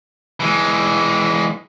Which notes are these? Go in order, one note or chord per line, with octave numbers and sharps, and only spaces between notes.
E3 G#3